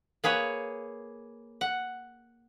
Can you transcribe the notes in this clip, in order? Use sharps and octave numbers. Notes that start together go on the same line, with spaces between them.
A#3 G#4 B4 C#5
F#5